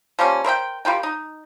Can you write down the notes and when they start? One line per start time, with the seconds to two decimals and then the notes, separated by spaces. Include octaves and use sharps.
0.19 F3 G3 A#3 C#4
0.44 A#4 C5 E5 G5
0.85 G3 F4 A#4 G5
1.03 D#4